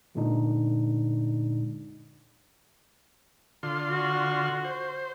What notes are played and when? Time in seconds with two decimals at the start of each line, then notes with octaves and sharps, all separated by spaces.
0.15 F#2 A#2 D3 G#3 D4 D#4
3.63 D3 F4 C6
3.90 F#4
4.64 C5